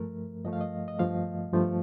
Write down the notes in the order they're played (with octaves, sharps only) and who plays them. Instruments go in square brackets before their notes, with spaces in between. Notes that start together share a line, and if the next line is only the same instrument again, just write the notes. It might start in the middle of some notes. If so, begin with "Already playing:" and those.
Already playing: [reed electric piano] G2 F3 A3 A#4
G2 F3 A3 D#5
F5
D#5
D#5
G2 F3 A3 F5
G2 F3 A3